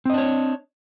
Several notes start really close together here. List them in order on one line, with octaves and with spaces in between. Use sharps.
C4 D#5 D4 C#5